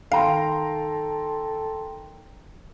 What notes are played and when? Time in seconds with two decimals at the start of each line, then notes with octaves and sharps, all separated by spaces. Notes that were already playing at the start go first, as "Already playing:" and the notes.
0.12 D#3 A4 F5 G5 A#5 C6